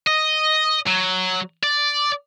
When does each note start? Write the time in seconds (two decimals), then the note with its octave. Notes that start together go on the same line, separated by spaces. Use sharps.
0.07 D#5
0.87 F#3
1.63 D5